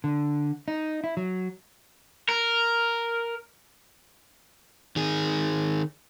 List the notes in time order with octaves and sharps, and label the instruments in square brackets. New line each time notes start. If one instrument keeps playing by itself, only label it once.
[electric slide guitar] D3
D#4
E4
F#3
[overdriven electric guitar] A#4
D#3 G#4